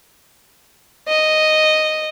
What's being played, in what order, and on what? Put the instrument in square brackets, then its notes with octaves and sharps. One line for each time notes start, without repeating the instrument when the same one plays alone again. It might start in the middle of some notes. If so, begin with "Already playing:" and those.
[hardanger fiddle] D#5